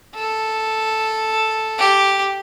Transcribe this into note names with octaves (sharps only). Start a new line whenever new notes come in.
A4
G4